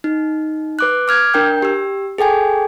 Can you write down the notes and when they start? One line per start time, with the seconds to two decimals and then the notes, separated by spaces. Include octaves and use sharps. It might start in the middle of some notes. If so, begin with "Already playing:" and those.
0.04 D#4
0.79 B4 D6 F#6
1.08 D6 F6 G#6
1.34 D4 A#4 G5 G6
1.63 G4 E6
2.18 G#4 A4 G5 G#5